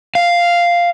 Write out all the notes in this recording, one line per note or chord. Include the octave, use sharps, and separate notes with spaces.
F5